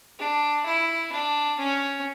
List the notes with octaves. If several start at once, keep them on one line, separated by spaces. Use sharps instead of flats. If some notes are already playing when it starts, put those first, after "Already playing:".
D4
E4
D4
C#4